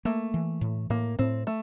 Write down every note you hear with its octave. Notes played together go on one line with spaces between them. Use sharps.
A3 A#3
E3
A2
A2 A#3
A2 C4
A3